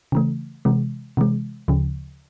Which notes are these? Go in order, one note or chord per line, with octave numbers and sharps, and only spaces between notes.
C#3 E3 A3
C3 E3 G#3
C3 E3 G#3
D2 C#3 F3